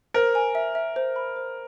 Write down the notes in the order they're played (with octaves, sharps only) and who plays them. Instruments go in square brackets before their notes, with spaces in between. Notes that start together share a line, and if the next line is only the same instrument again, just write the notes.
[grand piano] A#4 [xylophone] C5
[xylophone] G#5
E5
E5
C5
B5
C5